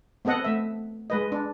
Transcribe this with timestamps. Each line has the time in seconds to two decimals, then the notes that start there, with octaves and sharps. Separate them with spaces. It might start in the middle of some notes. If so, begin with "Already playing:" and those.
0.25 B3 C4 A4 D#5 F#5
0.45 A3 E5
1.10 G#3 B4 D#5
1.32 D4